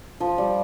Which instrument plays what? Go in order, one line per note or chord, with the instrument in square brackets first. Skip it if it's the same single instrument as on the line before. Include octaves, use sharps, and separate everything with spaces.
[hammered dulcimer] F3
G3